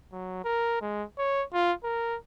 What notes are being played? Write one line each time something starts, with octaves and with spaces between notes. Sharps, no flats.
F#3
A#4
G#3
C#5
F4
A#4